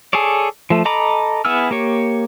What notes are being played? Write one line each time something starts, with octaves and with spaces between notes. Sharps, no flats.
G#4 A4 C#5 D5
F3 A3
A4 D#5 A#5 B5 D6
B3 E4 G#4 E6 F6
A#3 G4 C#5